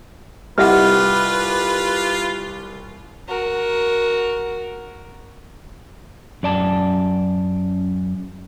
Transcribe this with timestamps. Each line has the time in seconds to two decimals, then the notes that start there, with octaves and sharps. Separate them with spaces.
0.58 C2 F4 B4 D#5 E5 F#5 F6
3.28 F#4 A#4
6.43 F#2 D5 A5